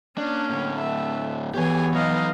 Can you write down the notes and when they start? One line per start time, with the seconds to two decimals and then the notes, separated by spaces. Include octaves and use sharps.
0.18 A#3 C#4 D4
0.49 A2 D3
0.78 A3 E5
1.54 E3 B3 G4 G#4 C#5 G#5
1.94 F#3 D#4 D#5 F5